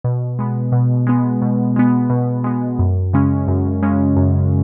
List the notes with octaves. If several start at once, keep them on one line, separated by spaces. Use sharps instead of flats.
B2
G#3 B3
B2
G#3 B3
B2
G#3 B3
B2
G#3 B3
F#2
C#3 G#3 C#4
F#2
C#3 G#3 C#4
F#2